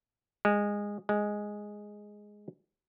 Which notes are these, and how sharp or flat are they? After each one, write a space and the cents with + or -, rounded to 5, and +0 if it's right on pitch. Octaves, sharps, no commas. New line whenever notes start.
G#3 -15
G#3 +0